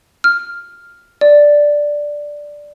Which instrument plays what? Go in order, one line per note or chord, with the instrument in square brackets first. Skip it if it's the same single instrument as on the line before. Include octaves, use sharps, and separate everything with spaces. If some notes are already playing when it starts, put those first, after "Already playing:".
[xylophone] F6
D5